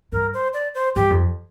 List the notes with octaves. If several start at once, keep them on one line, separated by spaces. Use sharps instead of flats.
G2 A#4
C5
D5
C5
G2 G4
F2